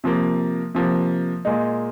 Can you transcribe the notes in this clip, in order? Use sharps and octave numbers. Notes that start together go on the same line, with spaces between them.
C3 F3 A#3
C3 F3 A#3
A#2 G#3 D#4